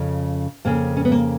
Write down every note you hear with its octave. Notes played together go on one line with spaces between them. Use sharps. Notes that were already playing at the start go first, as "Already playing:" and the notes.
Already playing: F2 C#3
F2 C#3 A#3
C#4
B3
A#3